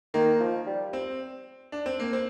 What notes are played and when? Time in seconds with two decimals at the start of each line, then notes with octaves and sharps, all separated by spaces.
0.14 D#3 A#3
0.40 F3
0.66 G3
0.93 C4
1.72 D4
1.86 C4
2.00 A#3
2.13 C4